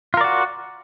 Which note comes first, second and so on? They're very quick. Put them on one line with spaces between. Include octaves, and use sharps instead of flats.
F4 A#4 D5 F#4